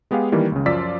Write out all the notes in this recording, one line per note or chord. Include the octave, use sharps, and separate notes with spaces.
G#3 B3 G4 G#4 F5
D#3 E3 G3 A#3
C#2 C#3
F#2 F3 F4 D5 E6 B6